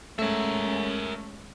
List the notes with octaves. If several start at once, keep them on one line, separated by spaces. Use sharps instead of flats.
G#3 A3 C#4 A#4 E5